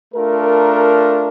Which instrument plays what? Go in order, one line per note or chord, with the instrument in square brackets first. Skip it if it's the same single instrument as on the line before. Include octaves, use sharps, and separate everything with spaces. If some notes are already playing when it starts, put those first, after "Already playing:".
[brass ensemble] A3 D4 F4 A#4